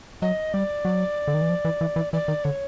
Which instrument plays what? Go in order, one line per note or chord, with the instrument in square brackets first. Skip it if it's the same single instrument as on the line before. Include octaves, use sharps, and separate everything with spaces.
[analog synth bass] F#3 [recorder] D#5
[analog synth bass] G3 [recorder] D5
[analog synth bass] F#3
D3
D#3
E3
F3
E3
E3
E3
[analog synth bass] E3 [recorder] D5
[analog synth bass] D#3
[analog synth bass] D3 [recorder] C#5